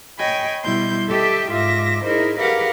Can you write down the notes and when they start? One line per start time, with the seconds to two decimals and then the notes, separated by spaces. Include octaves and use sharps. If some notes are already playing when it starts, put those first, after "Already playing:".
0.18 C#5 D#5 G5 G#5 B5
0.64 B2 G3 E4 C6 G6
1.10 G4 A4 D#5 E5 G5
1.52 G#2 F4 E5 D6 A#6
2.05 D#4 E4 G#4 A#4 C5
2.38 G4 G#4 A#4 B4 F5 F#5